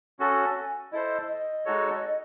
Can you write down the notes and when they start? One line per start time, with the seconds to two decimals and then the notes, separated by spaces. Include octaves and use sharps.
0.19 C#4 F#4 A4 G#5
0.92 E4 A4 C5 D#5
1.29 D#5
1.65 G#3 D#4 F#4 A4 C#5